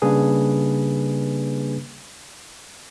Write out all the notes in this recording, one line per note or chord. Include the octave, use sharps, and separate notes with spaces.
C#3 G3 A#3 D4 G#4 B4